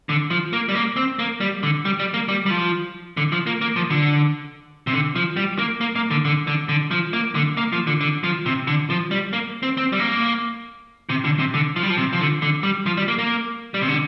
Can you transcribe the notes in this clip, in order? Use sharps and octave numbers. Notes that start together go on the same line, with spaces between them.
D3
F3
A#3
G3
A#3
C4
A#3
G3
D3
G3
G3
A#3
G3
G3
F3
D3
F3
A#3
A#3
F3
D3
C3
D3
F3
G3
A#3
A#3
A#3
D3
D3
D3
D3
F3
A#3
D3
A#3
F3
D3
D3
F3
C3
D3
F3
G3
A#3
C4
C4
G3
A#3
C3
D3
C3
D3
F3
G3
F3
C3
F3
D3
D3
G3
F3
G3
A#3
A#3
G3
C3
D3